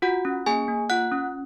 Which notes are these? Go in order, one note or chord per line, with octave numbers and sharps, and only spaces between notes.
F4 F#4 F#5
C#4
A#3 G#4 G#5
A#3
F4 F#5 F#6
C#4